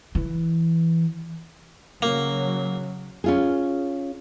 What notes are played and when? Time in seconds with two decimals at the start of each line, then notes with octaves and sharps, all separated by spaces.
0.15 E3
2.02 C#3 F#3 A#3
3.24 C#4 F4 G#4